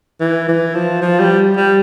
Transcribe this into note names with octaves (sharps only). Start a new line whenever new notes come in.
E3
E3
F3
F3
G3
G3